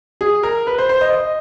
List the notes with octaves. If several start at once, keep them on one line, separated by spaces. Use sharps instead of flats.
G#4
A#4
B4
C5
C5
D#5
D#5